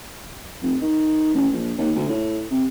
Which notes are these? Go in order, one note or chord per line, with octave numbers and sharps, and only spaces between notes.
F1
D#3
A1
A#1
D#2
D2
A2
C3